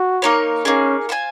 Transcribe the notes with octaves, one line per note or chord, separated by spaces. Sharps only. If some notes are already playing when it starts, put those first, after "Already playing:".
Already playing: F#4
A#3 D#4 A#4 C#5
A#3 C#4 D#4 G#4
F4 C5 F5 G#5